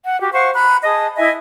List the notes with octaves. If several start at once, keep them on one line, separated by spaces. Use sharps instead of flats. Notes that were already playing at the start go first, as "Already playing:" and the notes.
F#5
F#4 G4
C5 F5 F#5 C#6
A#5 B5 F#6
G#4 D#5 A5 D#6
E4 D#5 E5 G#5